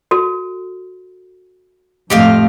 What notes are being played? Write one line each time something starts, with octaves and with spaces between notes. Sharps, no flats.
F#4 A4
F2 A2 A3 G4 D#5 F5